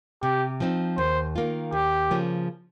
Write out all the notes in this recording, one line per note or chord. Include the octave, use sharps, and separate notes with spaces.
C3 G4
F3 C4 D#4
D#2 C5
D#3 A#3 F4
D#2 G4
C#3 F3 A#3 C#4